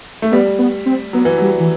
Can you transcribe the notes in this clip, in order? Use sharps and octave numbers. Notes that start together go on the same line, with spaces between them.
A3
G3 B3
B3
C4
F#3 B3
E3
F#3 G3
E3